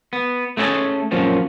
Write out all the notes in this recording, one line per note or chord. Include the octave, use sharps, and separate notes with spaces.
B3
A3 B3 C#4 E4 G#4 A4
F#2 A#2 F3 C#4